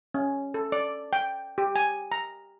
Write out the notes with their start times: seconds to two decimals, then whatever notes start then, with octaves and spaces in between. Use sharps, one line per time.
0.14 C#4
0.54 A4
0.72 D5
1.13 G5
1.58 G4
1.76 G#5
2.12 A#5